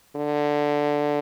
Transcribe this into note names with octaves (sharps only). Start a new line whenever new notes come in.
D3